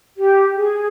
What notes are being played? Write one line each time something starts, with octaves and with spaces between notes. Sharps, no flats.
G4
G#4